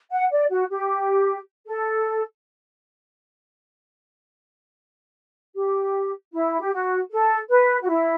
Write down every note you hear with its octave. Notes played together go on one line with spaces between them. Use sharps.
F#5
D5
F#4
G4
A4
G4
E4
G4
F#4
A4
B4
F#4
E4